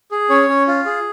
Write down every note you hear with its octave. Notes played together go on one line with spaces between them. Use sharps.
G#4
C#4 C#5
C#4
F4
G#4